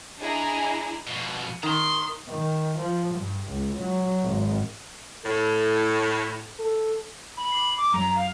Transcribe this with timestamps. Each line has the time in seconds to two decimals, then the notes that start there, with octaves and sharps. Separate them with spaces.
0.19 D4 E4 G#4 D#5 G#5 A#5
1.08 F2 B2
1.63 D#3 A#5 C6
2.28 D#3
2.79 F3
3.15 G2
3.48 C#2
3.77 F#3
4.22 G#1
5.26 A2 A4
6.60 A4
7.37 B5
7.52 D6 C7
7.77 D6
7.92 F#2 F#3 A#5 D7
8.15 F5